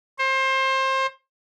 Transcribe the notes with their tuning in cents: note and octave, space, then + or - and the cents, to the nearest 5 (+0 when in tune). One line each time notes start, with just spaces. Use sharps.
C5 +25